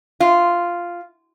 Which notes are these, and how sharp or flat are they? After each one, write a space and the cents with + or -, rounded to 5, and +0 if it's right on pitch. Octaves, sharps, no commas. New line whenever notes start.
F4 -5